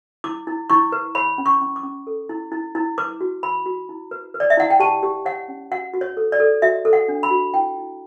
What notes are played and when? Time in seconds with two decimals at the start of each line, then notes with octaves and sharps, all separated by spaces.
0.24 E4 D6
0.47 E4
0.70 E4 C#6
0.92 B4
1.15 C#5 B5
1.38 C#4
1.46 C#6
1.61 C#4
1.76 D6
1.83 C#4
2.07 A4
2.29 E4
2.52 E4
2.75 E4
2.98 B4 D6
3.21 F#4
3.43 B4 B5
3.66 F#4
3.89 E4
4.11 B4
4.34 B4
4.40 D5
4.50 E5
4.57 E4 F#5
4.70 G5
4.80 G4 A5
5.03 G4
5.25 C#5 F#5
5.48 C#4
5.71 F#4 F#5
5.94 F#4
6.01 C#5
6.17 A4
6.32 D5
6.40 A4
6.62 F#4 E5
6.85 A4
6.93 F#5
7.09 D4
7.23 B5
7.31 F#4
7.54 E4 G5
7.76 E4